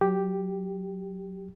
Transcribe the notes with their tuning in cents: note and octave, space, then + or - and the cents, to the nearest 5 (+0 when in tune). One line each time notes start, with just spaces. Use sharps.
F#3 +0 G4 +0